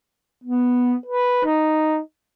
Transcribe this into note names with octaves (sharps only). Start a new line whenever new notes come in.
B3
B4
D#4